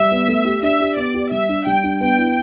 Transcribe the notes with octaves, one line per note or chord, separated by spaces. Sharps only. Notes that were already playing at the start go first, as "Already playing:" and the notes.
Already playing: G3 E5
B3
A3
G4
D4 E5
G4
B3 D5
G4
G3 E5
D4
G3 G5
D4
B3 G5
E4